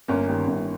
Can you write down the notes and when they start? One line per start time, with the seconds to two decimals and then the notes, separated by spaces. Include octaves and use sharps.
0.08 G1 A#3 C#4
0.28 G2 D#3
0.47 G1